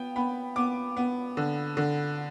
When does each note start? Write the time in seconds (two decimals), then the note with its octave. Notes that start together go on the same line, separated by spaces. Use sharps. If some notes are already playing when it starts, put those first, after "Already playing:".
Already playing: B3 G5
0.16 B3 B5
0.56 B3 D6
0.97 B3
1.37 D3
1.77 D3